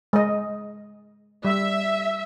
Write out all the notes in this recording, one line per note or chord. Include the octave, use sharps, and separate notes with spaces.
G#3 D#5
G3 E5